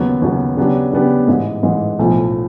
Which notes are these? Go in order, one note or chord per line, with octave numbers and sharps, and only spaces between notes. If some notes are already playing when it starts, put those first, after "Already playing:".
Already playing: D#2 C#3 F#3 B3
D#2 C#3 F#3 B3
C#3 F#3 B3 D4 G4
C#3 F#3 B3 D4 G4
A1 G#2 E3 G#3
A1 G#2 E3 G#3
B1 A2 F3